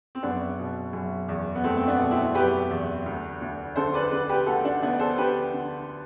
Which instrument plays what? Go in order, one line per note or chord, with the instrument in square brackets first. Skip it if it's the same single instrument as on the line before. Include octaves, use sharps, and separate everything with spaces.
[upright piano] C4
F#1 B3 D4
B2
F#1
E2
B3
F#1 A3 C4
C4
B3 D4
B2
C4 E4
F#1 G4 B4
E2
D2
D2
D3 A4 C5
B4 D5
D3 B4 D5
G4 B4
D2 F#4 A4
D4 F#4
D2 B3 D4
A4 C5
D3 G4 B4
D3